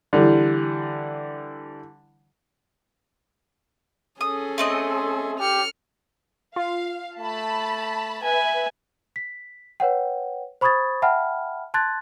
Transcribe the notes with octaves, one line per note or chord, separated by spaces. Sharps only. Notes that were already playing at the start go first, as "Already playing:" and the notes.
D3 E3 G3
C#4 G#4 A4 D#6
A3 C4 D#5
G4 F6 C#7
F4 F5
A3 A5 B5
B4 E5 G#5
B6
B4 C#5 F#5 G5
C5 B5 C#6 D#6 G#6 A6
E5 F#5 G5 A5 B5 F6
A5 C6 F#6 G#6 A6